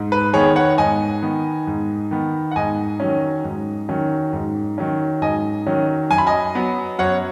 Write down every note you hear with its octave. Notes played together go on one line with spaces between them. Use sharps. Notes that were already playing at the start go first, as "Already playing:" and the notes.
Already playing: G#2
B4
D#3 B3 G#4 C#5
C#5 F#5
G#2 D#5 G#5
D#3 B3
G#2
D#3 B3
F#5
G#2 D#5 G#5
D#3 F#3 C#4
G#2
D#3 F#3 C#4
G#2
D#3 F#3 C#4
G#2 D#5 G#5
D#3 F#3 C#4
F#2 G#5
B5
D#5 G#5
F#3 B3
F#2 C#5 F#5